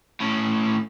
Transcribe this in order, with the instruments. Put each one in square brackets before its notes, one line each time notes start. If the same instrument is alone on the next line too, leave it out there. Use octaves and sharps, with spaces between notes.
[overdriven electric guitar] A2 C#4